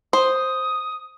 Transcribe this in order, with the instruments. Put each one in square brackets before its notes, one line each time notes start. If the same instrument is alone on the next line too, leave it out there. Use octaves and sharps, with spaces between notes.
[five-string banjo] C5 [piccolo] D#6